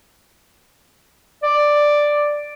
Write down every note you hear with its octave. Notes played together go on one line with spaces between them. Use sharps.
D5